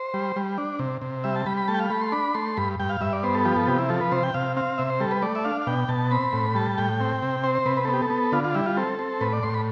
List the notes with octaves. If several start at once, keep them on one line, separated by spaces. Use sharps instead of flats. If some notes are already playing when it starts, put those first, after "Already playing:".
Already playing: C5
G3
G3
D4
C3
C3
G3 E5
A5
G3 B5
B5
A3 A5
G5
F5
A3 B5
C6
D4 B5
A3 C6
G2 B5
G2 G5
F5
G2 E5
D5
B3 C5
A4
F3 G4
A4
C3 G4
E4
F3 A4
B4
C3 C5
G5
C3 F5
C4 F5
C3 E5
C5
G3 A4
B4
A3 D5
E5
D4 F5
F5
B2 G5
B2 A5
C4 B5
A2
G3 A5
A2 G5
C4
C3
C4 C5
C5
C3 B4
B4
B3 A4
G4
A4
B3
D3 F4
F4
G3 E4
F4
C4 A4
C4
A2 B4
D5
A2 C6
B5